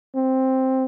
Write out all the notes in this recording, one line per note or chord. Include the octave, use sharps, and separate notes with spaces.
C4